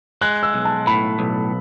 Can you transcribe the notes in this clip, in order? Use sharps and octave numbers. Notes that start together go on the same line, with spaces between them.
G#3 F#6
E6
B1
A5
A2 B5
B1